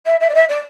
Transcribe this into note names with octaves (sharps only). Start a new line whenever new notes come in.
E5
E5
D5
E5
D5